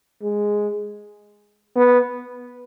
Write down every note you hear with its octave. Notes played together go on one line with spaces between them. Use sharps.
G#3
B3